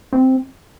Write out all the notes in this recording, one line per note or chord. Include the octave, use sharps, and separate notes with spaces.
C4